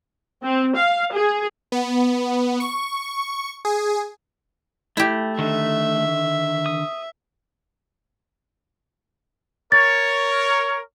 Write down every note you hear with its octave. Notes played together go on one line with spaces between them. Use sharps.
C4
F5
G#4
B3
C#6
G#4
A3 E4 G4
D3 D#3 E5
D#6
A#4 C#5 A6